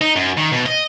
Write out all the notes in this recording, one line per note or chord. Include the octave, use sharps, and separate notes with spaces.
D#4
F#2
D#3
B2
D#5